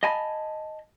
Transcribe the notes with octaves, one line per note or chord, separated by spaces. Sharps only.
D#5 F5 G#5 A5 B5